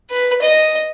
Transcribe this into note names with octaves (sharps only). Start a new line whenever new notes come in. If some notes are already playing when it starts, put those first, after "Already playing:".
B4
D#5